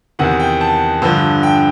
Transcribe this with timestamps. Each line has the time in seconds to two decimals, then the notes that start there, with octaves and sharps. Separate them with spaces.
0.19 E2 C3 D#3 F#5
0.40 G5
0.61 A5
1.02 G2 D3 F3
1.43 G5